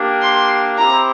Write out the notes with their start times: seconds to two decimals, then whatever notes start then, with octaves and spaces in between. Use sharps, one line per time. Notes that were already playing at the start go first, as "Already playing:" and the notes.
Already playing: A#3 D4 G4
0.22 C6
0.78 C4 E4 G4 C5 A#5